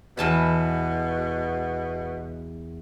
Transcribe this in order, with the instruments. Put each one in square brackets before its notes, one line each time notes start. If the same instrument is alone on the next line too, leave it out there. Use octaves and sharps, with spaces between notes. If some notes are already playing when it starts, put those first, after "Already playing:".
[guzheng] E2 A5 B5 [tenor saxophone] B2